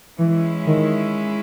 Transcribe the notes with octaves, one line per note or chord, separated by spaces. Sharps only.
E3 G#3 C#4 E4
D#3